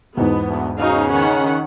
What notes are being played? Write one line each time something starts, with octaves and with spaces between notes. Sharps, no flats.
E2 G#2 B2 B3
D2
C#3 D#4 F#4 F5
D#3 C#4 F#5